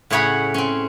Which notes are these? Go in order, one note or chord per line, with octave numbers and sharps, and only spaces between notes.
A2 C#3 G#4 C#5 F#5 B5
C4 C#4